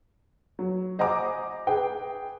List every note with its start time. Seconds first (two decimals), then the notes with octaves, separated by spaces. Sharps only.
0.59 F#3
0.99 C5 D#5 F#5 G#5 A#5 D6
1.67 G#4 B4 G5